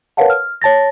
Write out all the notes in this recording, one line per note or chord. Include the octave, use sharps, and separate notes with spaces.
A#4 B4 C#5 F5 F#5 A5
F6
C#5 A5 A6 A#6